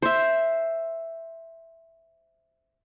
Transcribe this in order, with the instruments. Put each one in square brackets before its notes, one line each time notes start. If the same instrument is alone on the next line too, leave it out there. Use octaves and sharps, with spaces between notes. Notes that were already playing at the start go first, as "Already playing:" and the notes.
[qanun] C5 E5